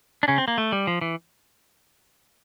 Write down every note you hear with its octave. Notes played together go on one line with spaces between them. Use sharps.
D4
C#3 C#4
C4
A#3
A3
G3
F3
E3